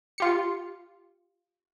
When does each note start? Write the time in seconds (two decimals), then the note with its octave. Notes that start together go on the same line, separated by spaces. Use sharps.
0.18 F4 G4 C#7